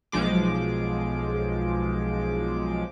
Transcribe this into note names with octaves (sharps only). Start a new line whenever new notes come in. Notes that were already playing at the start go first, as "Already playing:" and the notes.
B1 F3 G#3 D6